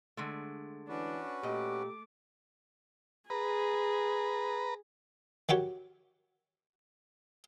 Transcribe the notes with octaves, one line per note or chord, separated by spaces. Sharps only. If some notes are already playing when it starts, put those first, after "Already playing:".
D3 G#3 A3
E3 C#4 D4 F#4 B4
A#2 A3 G4 D#5 D6
G#4 B4 A#5
D#3 F#4 G4 C#5